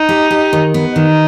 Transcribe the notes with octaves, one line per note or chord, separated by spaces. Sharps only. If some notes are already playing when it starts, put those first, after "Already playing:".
Already playing: D#4
G4
G4
D#3
B3
D#3 D#4